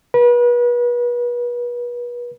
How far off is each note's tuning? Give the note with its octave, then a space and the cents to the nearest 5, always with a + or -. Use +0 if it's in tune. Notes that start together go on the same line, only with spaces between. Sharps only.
B4 -35